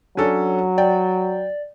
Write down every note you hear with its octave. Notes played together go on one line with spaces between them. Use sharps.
F#3 C#4 D4 A4
D5 G5